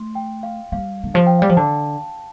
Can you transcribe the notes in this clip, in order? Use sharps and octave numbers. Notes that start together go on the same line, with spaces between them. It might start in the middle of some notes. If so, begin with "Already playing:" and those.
Already playing: A3 C6
G5
F5
G3 F5
D3
F3 F5
G5
G3 F5
F3
D3 A5